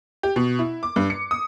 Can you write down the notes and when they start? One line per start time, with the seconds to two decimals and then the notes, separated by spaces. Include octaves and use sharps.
0.23 G4
0.36 B2
0.59 E4
0.83 D6
0.96 G2
1.10 C#7
1.31 D#6